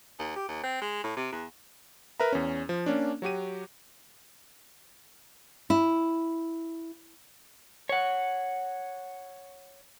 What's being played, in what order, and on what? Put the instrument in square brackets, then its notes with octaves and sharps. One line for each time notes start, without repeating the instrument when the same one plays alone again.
[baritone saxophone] D#2
G4
D#2
C4
G#3
A2
C3
E2
[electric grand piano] A#4 B4 E5 A#5
E2 C#4
F3
A#3 C#4 D4
F#3 F#4 G4 D#7
[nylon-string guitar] E4
[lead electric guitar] C#5 F#5